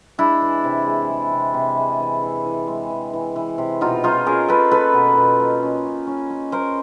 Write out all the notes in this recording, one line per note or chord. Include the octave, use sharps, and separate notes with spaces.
G#3 D4 E4
E3
C3
G#3
G#3
C3
C3
G#3
E3
E3
E3
G#3
E3
E3
E3
C3
B2 D#4 F4
C#4 D#4 F4
C#4 G#4 A#4
C#4 A4 B4
A#3 A4 B4
B2
B2
A#3
C#4
C#4
C#4
C#4
A#3 A#4 C5